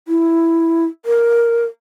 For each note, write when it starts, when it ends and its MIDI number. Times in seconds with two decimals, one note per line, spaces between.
0.08 0.85 64
1.06 1.65 70